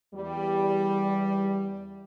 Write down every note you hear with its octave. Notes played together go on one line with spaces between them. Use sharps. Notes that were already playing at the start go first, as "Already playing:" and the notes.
E2 G3